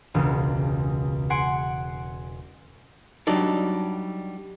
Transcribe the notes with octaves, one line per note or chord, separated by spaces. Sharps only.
E1 C#2
F#5 G#5 C6 C#7 D7
F#3 G3 D4 D#4 D5